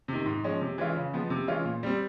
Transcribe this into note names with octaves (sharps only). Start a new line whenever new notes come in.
C3 D#3
G#2
F3 G#3 C#4
C3
E3 G#3 C#4 F4
C#3
F3 G#3 B3
C3
E3 G#3 C#4 F4
A#2
G3 C4